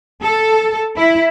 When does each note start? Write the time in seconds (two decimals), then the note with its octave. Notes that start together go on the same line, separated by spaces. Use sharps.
0.23 A4
0.96 E4